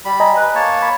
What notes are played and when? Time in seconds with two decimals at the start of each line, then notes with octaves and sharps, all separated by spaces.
0.05 G3 B5
0.20 D#5 G#5 A#5
0.36 B4
0.55 A#3 C#5 A5
0.82 B5